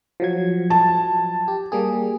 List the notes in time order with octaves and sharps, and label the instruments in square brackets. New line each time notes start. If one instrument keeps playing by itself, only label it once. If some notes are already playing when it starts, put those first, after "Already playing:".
[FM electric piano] F3 F#3 G#6
[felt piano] A5
[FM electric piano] G4
G3 A#3 G#4